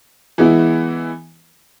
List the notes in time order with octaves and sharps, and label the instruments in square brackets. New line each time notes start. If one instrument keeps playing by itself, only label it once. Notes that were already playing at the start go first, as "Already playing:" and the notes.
[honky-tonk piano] E3 G#3 B3 E4